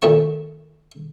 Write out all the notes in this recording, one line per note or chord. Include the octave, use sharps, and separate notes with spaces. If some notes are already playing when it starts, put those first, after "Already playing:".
A#2 D#3 F3 A3 A5 C#6